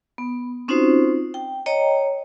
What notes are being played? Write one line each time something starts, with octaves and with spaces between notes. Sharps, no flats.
B3
C4 C#4 D#4 F4 F#4 C5
G5
C#5 D#5 G5 A#5